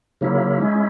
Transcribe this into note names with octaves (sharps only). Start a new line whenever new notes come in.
C#3 F#3 A#3 E4
G#3 C#4 E4